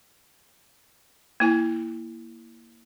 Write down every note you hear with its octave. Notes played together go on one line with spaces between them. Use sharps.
A#3 E4 G#5